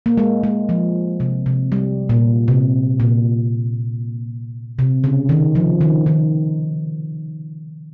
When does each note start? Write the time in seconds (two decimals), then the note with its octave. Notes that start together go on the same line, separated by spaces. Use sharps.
0.06 A#3
0.17 G#3
0.43 G#3
0.69 F3
1.20 C3
1.46 C3
1.72 G3
2.09 A#2
2.48 C3
3.00 A#2
4.79 C3
5.04 C#3
5.29 D#3
5.55 F3
5.81 D#3
6.06 D#3